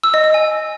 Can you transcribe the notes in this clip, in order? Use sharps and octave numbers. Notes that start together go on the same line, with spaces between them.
E6
D#5
E6
G#5